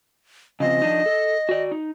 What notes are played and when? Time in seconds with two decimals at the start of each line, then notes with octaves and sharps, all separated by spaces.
0.60 C#3 F3 C4 D#5
0.82 F3 D4 D#4
1.06 A4
1.49 F#4 D5
1.71 D#4